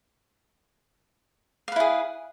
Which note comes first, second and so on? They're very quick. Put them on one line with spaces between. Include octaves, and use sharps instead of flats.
F5 B4 E4 G#4